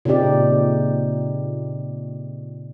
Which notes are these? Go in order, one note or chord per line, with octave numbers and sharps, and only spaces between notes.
A#2 C#3 C4 D#4 G4 D5